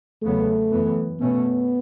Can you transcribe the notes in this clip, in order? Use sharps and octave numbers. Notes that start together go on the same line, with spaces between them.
E2 C#3 F#3 A3 B3
F#2 E3 B3
B2 A3 B3 C#4